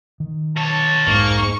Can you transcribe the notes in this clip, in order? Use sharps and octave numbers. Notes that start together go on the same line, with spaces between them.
D#3
B2 C#5 A5
B1 F2 G#2 A#3 C#6